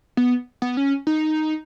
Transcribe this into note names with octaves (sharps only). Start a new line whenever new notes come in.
B3
B3
C#4
D#4